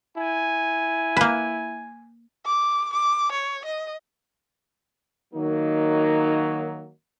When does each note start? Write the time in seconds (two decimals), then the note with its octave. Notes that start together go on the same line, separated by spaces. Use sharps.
0.16 E4 G#5
1.17 A#3 B4
2.46 D6
2.93 D6
3.32 C#5
3.65 D#5
5.34 D#3 F#3 A#3 D#4